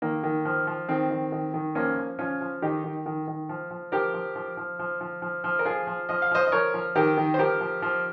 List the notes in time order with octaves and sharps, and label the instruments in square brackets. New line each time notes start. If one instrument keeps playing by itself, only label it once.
[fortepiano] D#3 A#3
D#3
F3
F3
D#3 C4
D#3
D#3
D#3
F3 A#3 C#4
F3
F3 C#4 F4
F3
D#3 D#4 G4
D#3
D#3
D#3
F3
F3
F3 G4 A#4
F3
F3
F3
F3
F3
F3
F3
A#4
F3 F4 G#4
F3
F3 D#5
F5
F3 C5 D#5
D#5
F3 A#4 C#5
F3
D#3 G4 A#4
D#3
C5
F3 G4 A#4
F3
F3